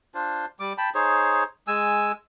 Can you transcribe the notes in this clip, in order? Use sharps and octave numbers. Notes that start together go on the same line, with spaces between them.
D4 F4 C5
G3 D6
G5 A5 B5
D#4 G#4 C5 C#5
G#3 G#5 E6